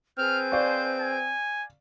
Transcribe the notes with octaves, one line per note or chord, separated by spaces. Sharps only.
C4 G#4 B4 F6 G6
C5 D5 F5 C#6
G#5